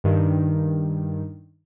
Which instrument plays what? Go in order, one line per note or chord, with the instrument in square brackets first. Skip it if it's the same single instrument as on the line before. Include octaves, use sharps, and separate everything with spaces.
[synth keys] G2 D#3